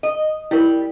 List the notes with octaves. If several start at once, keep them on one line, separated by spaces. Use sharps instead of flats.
D#5
G3 E4 A#4